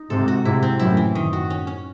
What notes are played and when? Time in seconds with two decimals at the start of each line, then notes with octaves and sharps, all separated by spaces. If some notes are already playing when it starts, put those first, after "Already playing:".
Already playing: D#4
0.10 G#2 C3 A4
0.28 F#4
0.45 G#2 C3 E4
0.63 C4
0.80 F#2 A2 E4
0.97 E3
1.15 D#3
1.33 F#4
1.50 C#4
1.67 C#4